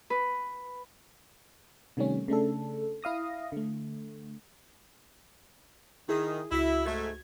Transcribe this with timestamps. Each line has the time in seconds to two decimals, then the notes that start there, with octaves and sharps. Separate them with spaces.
0.10 B4
1.97 C3 D#3 G3 A3 C#4
2.28 C#3 A3 D4 A4
3.03 E4 F5 D#6 A#6
3.52 D3 A3
6.09 D#3 E4 G#4 D#6
6.51 C#2 E4 F#4 B6
6.86 G#2 A3 G#6